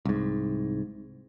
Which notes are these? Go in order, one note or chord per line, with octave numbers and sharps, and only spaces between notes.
C2 G#2